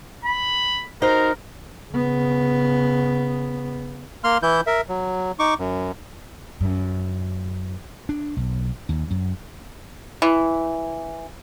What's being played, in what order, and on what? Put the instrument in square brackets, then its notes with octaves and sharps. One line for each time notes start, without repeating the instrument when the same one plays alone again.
[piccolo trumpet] B5
[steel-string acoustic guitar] D#4 F#4 C5 [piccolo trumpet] A#4
[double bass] C#3 B3
[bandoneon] A#3 C6 F6
E3 E4 G6
A#4 E5
F#3
D#4 C#6 D6
F#2
[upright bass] F#2
[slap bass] D4
B1
D#2
F#2
[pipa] E3